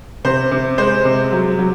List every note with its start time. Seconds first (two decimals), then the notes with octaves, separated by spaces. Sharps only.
0.25 C3 C5
0.51 C3
0.78 G#3 C5
1.05 C3
1.32 F#3
1.59 F#3